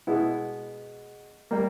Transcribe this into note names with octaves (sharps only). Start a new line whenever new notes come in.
B2 G#3 B3 E4
G3 A#3